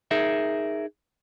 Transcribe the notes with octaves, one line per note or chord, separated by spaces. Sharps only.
D#4 G#4 A#4 E5